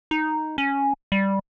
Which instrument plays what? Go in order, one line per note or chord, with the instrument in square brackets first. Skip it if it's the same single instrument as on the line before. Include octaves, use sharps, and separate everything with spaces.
[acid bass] D#4
C#4
G3